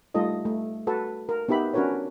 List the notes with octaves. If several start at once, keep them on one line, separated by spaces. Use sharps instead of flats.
G3 A3 D#4 F4 A4 D#5
A3
F#4 A4 B4 A5
A#4
B3 D#4 G4 E5 B5
C#4 D4 F#4 A#4 B4 C#5